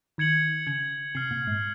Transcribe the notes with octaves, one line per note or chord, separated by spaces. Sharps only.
D#3 G#6 C#7 F#7
C#3 G#6 C#7 F#7
C3 F6 C7 F#7
A#2
G#2